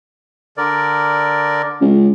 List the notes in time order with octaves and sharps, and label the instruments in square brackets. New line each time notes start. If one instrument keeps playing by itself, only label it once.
[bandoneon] D3 A#4 D5
[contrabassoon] C#2